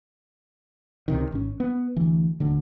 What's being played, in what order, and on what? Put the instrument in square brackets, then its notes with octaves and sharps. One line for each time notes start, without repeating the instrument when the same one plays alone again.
[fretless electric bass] C#2 C3 D#3
G#1 C#4
B3
D2 E3
D#1 D2 D3